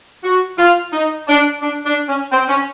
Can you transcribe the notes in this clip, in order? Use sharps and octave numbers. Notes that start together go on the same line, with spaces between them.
F#4
F4
D#4
D4
D4
D4
C#4
C4
C#4